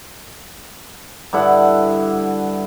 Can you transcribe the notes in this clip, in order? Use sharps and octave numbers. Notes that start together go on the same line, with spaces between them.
G2 D3 E4 F#5